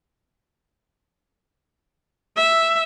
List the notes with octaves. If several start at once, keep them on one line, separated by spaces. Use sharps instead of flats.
E5